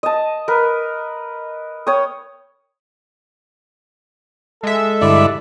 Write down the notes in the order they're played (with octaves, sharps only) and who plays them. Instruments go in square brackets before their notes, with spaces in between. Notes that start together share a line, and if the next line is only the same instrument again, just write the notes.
[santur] D#5 A5
A#4 B4
C#5 G5 D#6
[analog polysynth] G#3 E5 [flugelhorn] A4
[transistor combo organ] G2 D3 E4 [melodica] D5